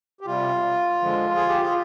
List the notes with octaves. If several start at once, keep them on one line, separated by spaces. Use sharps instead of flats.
G4
C3 G3 F4
D3 F3 G#3
G#4
G4
F4